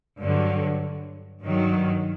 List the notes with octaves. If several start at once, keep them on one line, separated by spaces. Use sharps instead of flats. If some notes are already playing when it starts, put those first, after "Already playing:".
G2 D3 F#3
G2 D#3 F#3